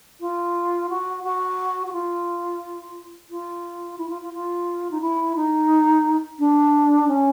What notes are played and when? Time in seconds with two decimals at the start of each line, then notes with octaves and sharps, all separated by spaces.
0.20 F4
0.89 F#4
1.23 F#4
1.86 F#4
1.92 F4
3.30 F4
3.98 E4
4.09 F4
4.22 F4
4.33 F4
4.90 D#4
5.01 E4
5.35 D#4
6.39 D4
7.07 C#4